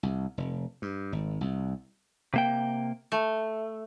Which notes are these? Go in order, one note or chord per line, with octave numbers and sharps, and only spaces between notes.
C2
F1
G2
G#1
C2
C3 A#3 G5
A3